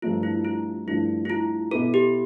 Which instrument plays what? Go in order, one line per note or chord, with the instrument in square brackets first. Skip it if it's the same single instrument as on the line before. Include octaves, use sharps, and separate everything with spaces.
[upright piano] G2 F3 A3 D4 [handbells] F4
[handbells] E4
F4
[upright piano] G2 F3 A3 D4 [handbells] E4
[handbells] E4
F4
[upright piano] B2 B3 E4 B4 [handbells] A4
[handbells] G4